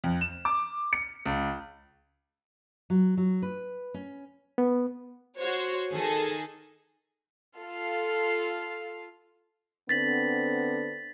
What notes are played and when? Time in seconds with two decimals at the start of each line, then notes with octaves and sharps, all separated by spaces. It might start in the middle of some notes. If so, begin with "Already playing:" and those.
0.04 F2
0.21 E7
0.45 D6
0.93 C#7
1.25 C#2
2.90 F#3
3.17 F#3
3.43 B4
3.94 C#4
4.58 B3
5.38 F#4 C5 C#5
5.92 D#3 G#4 A4
7.57 F4 A4 F5
9.89 D3 B3 C4 A6 B6 F#7